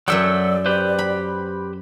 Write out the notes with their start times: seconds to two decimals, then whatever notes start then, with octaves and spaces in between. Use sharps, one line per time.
0.08 F#2 F#3 A4 D5 E5 G5 E6
0.66 G4 B4 C5
0.99 B5